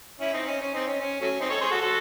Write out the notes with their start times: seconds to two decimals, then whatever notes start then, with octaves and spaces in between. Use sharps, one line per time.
0.20 C#4 E4
0.33 C4 D#4
0.47 C#4
0.61 C#4
0.73 C4 D#4
0.88 C#4
1.00 C#4
1.21 F#3 A3 C#4
1.41 C4 D#4
1.50 A4 C#5
1.61 G#4 C5
1.70 F#4 A4
1.81 F#4 A4